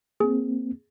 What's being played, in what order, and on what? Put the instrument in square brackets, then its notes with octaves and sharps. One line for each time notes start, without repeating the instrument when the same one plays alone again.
[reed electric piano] A#3 C4 [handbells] G#4